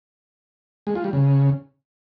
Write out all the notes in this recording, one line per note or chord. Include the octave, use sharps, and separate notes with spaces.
G#3
F4
G3
C#3